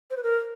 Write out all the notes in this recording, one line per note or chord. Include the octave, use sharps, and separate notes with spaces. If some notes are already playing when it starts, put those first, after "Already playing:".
C5
B4
A#4